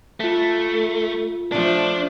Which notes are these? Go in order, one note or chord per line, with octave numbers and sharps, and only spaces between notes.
A3 F4 B6
F3 A3 D4